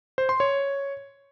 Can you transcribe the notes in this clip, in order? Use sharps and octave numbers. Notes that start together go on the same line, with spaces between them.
C5
C6
C#5